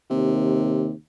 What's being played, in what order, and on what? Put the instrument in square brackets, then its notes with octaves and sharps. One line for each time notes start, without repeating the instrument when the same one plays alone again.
[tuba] D#2 [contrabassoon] C3